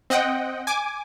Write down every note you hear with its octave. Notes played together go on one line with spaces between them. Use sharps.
C4 D#5 F#5 G5
G#5 D6